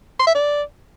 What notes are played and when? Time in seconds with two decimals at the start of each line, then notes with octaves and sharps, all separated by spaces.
0.19 C6
0.27 E5
0.35 D5